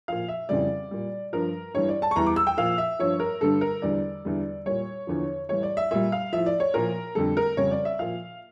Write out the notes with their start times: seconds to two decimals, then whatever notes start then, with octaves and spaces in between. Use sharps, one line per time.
0.08 A#2 F3 F5
0.28 E5
0.49 F2 C#3 E3 G3 D5
0.91 A#2 G3
1.33 G2 F3 A#4
1.74 G2 E3 G3 C#5
1.89 D5
2.02 A5
2.11 C#6
2.16 E2 E3 G3 A#5
2.27 D6
2.36 E6
2.47 G5
2.57 A#2 F3 F5
2.78 E5
2.99 G2 F3 C#5
3.20 A#4
3.41 G2 D3 G3 A4
3.61 A#4
3.82 E2 D3 G3 D5
4.25 E2 D3 G3
4.66 A#2 G3 C#5
5.07 E2 D3 F3
5.49 A2 E3 G3 C#5
5.63 D5
5.77 E5
5.91 A#2 G3 E5
6.12 F5
6.33 A2 F3 E5
6.46 D5
6.60 C#5
6.74 A#2 F3 A#4
7.15 F2 D3 G3 A4
7.37 A#4
7.57 F2 C#3 G3 C#5
7.71 D5
7.85 E5
7.99 A#2 F3 F5